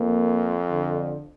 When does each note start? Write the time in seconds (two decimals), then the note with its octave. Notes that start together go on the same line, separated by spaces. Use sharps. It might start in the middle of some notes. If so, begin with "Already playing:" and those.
Already playing: F2 A#3
0.71 D3